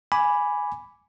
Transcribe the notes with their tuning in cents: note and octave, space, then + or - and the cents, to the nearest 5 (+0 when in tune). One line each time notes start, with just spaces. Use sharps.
G#5 +0 B5 +0 D6 -10